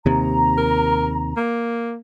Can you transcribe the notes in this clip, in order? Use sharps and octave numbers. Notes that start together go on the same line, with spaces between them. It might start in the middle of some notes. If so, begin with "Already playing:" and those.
D#2 C3 A#5
A#4
A#3